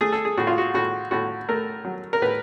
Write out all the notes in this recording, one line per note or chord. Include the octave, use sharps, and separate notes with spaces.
A3 G#4
A4
G#4
A2 F#4
F4
F#4
A2 F#4
A2 F#4
A3 A#4
F#3
A#4
A2 B4